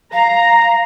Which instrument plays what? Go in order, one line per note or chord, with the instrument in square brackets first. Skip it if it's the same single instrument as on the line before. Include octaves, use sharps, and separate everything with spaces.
[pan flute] F5 [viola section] A#5